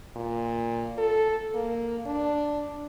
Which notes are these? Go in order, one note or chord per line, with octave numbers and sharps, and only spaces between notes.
A#2
A4
A#3
D4